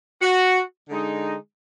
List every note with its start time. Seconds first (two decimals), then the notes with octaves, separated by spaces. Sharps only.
0.21 F#4
0.88 D3 G#3 D#4